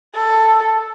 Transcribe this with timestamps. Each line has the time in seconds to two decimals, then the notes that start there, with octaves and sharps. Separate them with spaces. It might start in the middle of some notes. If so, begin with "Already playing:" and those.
0.15 A4